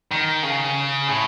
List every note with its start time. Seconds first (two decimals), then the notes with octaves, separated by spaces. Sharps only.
0.11 D#3
0.43 C#3
1.08 A2